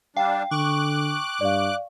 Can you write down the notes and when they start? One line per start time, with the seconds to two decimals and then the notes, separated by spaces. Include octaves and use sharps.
0.17 G3 D4 F5 G5
0.51 D3 C#6 D6 F#6
1.41 G2 D5 F5